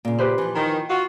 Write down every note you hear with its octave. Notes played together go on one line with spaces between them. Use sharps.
A#2 C#3
G4 B4 C5
E3 F3
D#3
F4 F#4